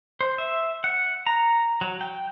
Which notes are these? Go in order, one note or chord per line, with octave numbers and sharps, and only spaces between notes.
C5
E5
F#5
A#5
F#3
G5